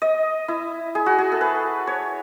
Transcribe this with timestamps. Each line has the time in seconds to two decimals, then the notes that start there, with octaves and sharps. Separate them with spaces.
0.02 D#5
0.48 E4
0.95 G#4
1.06 F#4
1.18 G#4
1.32 A4
1.41 B4
1.87 C#5